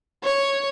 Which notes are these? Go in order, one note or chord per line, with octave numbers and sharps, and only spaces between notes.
C#5